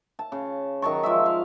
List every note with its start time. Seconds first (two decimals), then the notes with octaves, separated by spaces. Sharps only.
0.19 A5
0.32 C#3
0.82 D#3 F#3 A5 C#6
1.03 F3 G#3 E5
1.26 F5